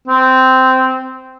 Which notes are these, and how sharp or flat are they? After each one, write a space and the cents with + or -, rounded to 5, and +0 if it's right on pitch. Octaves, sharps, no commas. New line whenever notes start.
C4 -10